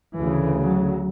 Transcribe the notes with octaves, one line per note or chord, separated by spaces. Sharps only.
D2 C#3 E3
F#3